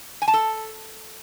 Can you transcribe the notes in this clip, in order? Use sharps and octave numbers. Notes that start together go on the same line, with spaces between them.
G#5
A5
A4